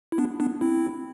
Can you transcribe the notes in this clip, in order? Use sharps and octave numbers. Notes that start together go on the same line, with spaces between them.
E4
B3 D4
B3 D4
C4 E4